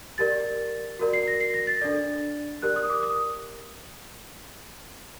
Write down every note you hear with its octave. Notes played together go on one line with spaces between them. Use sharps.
G4 A#4 D5 A6
F#4 A#4 D5
C7
A#6
C7
A#6
A6
D4 A4 D5
G4 A#4 D5 F#6
D#6
D6
D#6